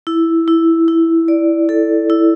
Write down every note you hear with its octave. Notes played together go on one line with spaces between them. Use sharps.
E4
E4
E4
D5
A4
E4